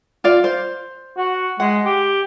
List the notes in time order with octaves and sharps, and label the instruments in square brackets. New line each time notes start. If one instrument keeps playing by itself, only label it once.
[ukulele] F4 D5 F5
C5
[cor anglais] F#4
[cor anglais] G#3 [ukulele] F#5
[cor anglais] G4